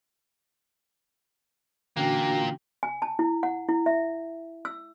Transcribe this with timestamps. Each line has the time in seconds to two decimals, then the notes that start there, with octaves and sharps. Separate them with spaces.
1.97 A#2 D3 E3 A#3 C#4 D4 F#4 G5
2.83 G#5
3.02 A5
3.19 E4
3.43 F#5
3.69 E4
3.86 E5
4.65 E6